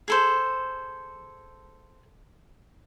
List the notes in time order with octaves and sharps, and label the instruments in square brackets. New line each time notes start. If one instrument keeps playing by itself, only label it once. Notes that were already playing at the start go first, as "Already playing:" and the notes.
[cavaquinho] G#4 A4 C5